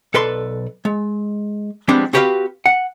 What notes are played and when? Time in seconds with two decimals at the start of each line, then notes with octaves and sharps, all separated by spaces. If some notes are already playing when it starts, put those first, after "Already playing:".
0.14 B1 A4 B4 D5 C6
0.85 G#3
1.88 F3 G3 G#3 B3 C4 D4
2.13 C4 F#4 G4 B4 D#5 F5
2.66 F#5